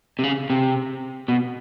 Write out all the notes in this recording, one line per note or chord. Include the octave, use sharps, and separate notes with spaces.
C3
C#3
C3
B2